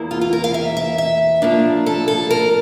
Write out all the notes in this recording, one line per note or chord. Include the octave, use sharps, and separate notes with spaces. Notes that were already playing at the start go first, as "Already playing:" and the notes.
Already playing: E2 E3 A#3 E4
F4
F4
A#4
F5
E5
E5
E5
A2 F3 A#3 D4
A4
A4
A#4